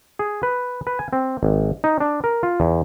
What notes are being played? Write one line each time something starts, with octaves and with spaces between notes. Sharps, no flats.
G#4
B4
B4
G#5
C4
G#1
D#4
D4
A#4
F4
E2